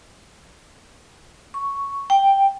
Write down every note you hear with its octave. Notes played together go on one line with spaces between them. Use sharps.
C#6
G5